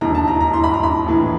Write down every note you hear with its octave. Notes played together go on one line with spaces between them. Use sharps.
E1 D#2 D3 A#5
A5
A#5
A#5
C6
B5
A#5
B5
A#1 A2 E3